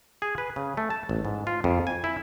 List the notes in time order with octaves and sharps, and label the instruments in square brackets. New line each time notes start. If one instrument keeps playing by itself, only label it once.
[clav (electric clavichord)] G#4
B4
C#3
A3
A5
A1
G#2
F4
F2
G#5
E4